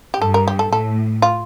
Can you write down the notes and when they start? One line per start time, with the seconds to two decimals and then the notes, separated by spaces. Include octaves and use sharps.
0.14 G4
0.22 G2 A4
0.34 A#4
0.48 G4
0.59 A4
0.73 A2 A4
1.22 F4